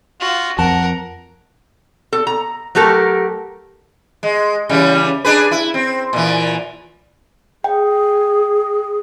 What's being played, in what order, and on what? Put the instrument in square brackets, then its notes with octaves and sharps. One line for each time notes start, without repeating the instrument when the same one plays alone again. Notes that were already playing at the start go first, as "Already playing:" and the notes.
[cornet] F4 [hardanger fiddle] F#4
[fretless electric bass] F2 [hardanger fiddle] A#4 [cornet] F#5 [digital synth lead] A5
[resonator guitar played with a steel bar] A4
A#5
F#3 A3 G4 A4 A#4
[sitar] G#3
C#3 E3 G3
D4 G#4 B4
E4
C4
A#2 E3
[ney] G#4 [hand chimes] G5